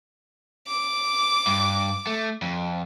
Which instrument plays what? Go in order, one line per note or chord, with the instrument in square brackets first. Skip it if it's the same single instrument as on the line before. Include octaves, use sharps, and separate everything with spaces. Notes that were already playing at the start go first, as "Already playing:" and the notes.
[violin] D6
[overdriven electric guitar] G2
A3
F2